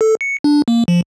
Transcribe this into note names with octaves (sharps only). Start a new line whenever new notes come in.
A4
C#7
D4
A#3
F3